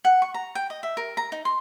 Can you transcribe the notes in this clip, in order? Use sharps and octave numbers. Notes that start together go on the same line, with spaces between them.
F#5
C#6
A#5
G5
D#5
E5
A#4
A#5
D#4
C6